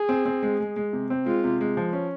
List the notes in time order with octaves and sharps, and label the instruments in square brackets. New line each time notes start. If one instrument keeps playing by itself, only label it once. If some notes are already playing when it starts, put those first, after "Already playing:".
Already playing: [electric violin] G#4
[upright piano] C4
C4
G#3
G#3
G#3
C3
C4
[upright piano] G#3 [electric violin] F4
[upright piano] C3
G#3
F3
C#4